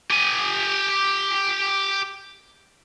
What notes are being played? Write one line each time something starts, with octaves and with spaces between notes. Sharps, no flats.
G4 G#5